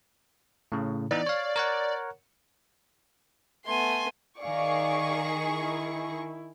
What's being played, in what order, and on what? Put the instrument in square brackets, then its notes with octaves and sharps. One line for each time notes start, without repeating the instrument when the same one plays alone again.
[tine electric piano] A2 C#3
[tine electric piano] E3 B3 D#4 [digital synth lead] D5
[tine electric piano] C#5 F5
A#4 C#5 F#5
[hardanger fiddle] A3 B3 [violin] G#5 C6
[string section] D#3 G#4 C#6 [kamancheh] D5 F5
[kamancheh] E4